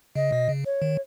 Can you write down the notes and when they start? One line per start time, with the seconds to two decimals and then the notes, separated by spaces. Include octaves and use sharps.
0.15 C#3 D#5
0.32 B2
0.49 C#3
0.66 C#5
0.82 D#3